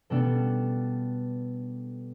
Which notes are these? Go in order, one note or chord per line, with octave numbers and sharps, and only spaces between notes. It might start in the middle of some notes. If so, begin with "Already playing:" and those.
B2 G3 B3 D4 A4